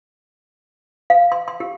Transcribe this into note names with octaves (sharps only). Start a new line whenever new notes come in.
F5
C6
C6
G4